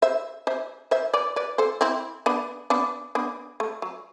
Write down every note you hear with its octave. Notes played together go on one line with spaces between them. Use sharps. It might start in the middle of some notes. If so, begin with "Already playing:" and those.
C5 E5
C5 E5
C5 E5
B4 D5
B4 D5
A4 C5
C4 E4
B3 D4
B3 D4
B3 D4
A3
F#3